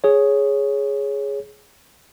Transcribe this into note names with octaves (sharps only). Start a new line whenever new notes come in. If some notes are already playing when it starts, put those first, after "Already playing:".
G#4 C#5